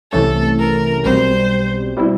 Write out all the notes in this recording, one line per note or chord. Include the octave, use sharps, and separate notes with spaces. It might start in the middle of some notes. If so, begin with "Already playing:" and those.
C2 C3 E3 A3 C#4 A4
A#4
B1 B2 G3 C4 C5
B2 G3 C4 E4